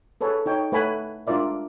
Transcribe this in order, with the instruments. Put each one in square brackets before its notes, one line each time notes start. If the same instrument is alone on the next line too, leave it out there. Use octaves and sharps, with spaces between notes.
[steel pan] G#4 A4 B4 C#5
D#4 C#5 G5
A3 B4 C#5 F#5 G#5 B5
G#3 D4 F4 A#4 D5 E5